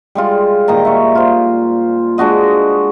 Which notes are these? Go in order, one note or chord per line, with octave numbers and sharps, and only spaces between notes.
G3 G#3 F4
A#2 D#3 D#5 A#5
E5 C#6
F4 C5
G#3 D4 F#4 D#5